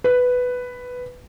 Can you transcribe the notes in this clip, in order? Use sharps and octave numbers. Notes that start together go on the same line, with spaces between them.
B4